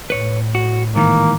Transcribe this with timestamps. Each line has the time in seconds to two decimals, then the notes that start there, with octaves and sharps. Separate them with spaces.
0.10 A2 B4 C#5
0.55 F#4
0.96 G#2 D#3 E3 A#3